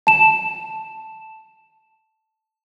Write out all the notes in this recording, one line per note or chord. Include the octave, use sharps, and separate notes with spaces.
A5 E7